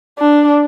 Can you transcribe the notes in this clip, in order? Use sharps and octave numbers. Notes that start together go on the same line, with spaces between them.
D4